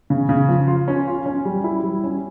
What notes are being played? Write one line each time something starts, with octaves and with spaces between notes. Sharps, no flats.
C#3
C#3
F3
F4
C#4
F4
C#4
G3
E4
G3
C#4